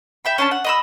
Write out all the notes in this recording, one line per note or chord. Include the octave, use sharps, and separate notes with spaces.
E5 G5 B5
C#4 D4 A5
F#5
D#5 B5 E6